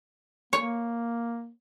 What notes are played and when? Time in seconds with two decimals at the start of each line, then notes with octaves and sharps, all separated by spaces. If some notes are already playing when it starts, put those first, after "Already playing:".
0.53 A#3 C#5